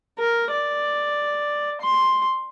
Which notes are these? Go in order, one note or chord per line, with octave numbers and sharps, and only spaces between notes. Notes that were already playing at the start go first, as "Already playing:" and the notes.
A#4
D5
C6